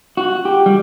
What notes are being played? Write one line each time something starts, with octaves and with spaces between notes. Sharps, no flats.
F#4
G4
G3